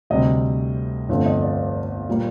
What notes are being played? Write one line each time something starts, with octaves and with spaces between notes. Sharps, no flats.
D2 C3 G3 C4 D#5
G1 F2 D3 A3 C4
D#5
D5
A#2 G3 A#3